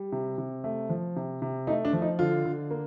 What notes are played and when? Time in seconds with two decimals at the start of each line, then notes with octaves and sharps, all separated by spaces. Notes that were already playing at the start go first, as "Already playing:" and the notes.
Already playing: G3
0.12 C3
0.38 C3
0.64 A3
0.90 F3
1.16 C3
1.42 C3
1.67 A3 D#4
1.85 D4
1.93 F3
2.02 D#4
2.19 D3 F4
2.45 D3
2.71 A#3